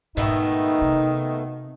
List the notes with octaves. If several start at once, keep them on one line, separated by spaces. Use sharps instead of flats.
G#2 B2 D#3 A3 B3 D#4
C3